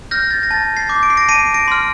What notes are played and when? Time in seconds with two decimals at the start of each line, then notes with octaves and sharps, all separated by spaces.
0.11 F6 G6 A#6
0.31 A6
0.43 A#6
0.51 A5 A6
0.77 A6 C7
0.89 D6 G6
1.03 D7
1.10 C7
1.17 A#6 D7
1.28 A5 C7 D#7
1.54 A#6 D7
1.68 C6 F6